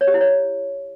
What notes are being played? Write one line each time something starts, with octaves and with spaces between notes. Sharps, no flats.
C#5
G4
E4
C#5